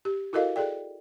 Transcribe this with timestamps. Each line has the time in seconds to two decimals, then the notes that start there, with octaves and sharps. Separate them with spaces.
0.05 G4
0.33 E4 F#4 A4 A#4 D#5 F5
0.56 G#4 A4 D5 G5